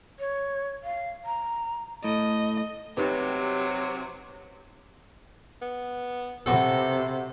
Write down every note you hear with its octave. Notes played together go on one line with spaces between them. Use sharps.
C#5
F5
A#5
A2 D#5
C3 F#3 D#4 G4 B4
B3
C3 C4 F#4 A4 B4